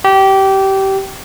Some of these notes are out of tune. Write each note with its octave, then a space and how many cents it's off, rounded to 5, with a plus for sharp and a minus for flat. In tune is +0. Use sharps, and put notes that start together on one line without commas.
G4 -20